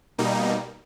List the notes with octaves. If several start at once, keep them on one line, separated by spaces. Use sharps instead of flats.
B2 G3 A#3 D#4